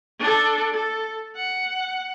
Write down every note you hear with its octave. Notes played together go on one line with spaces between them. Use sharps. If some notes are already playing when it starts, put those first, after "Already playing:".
D4 A4
A4
F#5